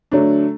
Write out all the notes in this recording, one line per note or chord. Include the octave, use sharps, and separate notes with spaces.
D3 F#3 A3 D4